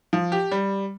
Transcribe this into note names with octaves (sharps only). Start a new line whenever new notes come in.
F3
G4
G3